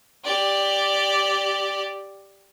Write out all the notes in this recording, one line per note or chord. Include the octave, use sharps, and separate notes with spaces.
G4 D5